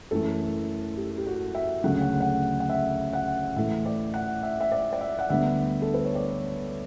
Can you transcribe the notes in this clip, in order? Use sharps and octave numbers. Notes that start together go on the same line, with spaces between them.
F#2 E3 A3 A4
G4
G4
F#4
E5
D2 C#3 F#3 A3 F#5
F#5
F#5
F#5
E5
F#5
A2 E3 A3 E5
D5
F#5
E5
E5
D5
D5
E5
F#5
D2 D3 G3 B3 E5
A4
B4
C#5
D5